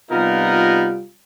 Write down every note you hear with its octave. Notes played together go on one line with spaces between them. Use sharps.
C3 G3 B3 D#4 F4 A#4